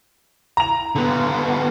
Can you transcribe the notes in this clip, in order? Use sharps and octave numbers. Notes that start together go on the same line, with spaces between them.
A#5 F7
D3 B3